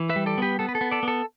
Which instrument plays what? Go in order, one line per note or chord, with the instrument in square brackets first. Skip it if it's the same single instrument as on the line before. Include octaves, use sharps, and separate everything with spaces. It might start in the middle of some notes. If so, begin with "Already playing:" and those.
Already playing: [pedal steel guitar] E3
B4 E5
G3
A4 D5
B3 G4 B4
B3 A4
B4
A4
B3
A4 D5
B3 A4